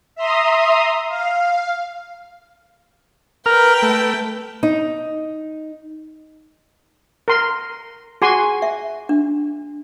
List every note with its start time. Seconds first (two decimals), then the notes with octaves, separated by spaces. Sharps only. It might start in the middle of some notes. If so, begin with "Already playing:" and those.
0.15 E5 A#5 C6 D#6
1.09 F5
3.46 A#4 B4 G5 F6
3.82 A3
4.63 D#4
7.28 A#4 C6
8.22 F#4 G#4 G#5 C6
8.62 E5
9.09 D4